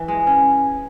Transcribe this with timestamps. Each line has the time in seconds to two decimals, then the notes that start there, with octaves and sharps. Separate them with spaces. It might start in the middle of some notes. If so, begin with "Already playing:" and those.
Already playing: E3
0.08 G#3
0.27 C#4